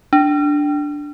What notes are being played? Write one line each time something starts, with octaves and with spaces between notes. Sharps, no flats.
D4